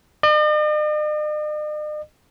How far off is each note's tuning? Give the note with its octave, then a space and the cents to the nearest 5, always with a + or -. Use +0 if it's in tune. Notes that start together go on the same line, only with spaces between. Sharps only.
D#5 -45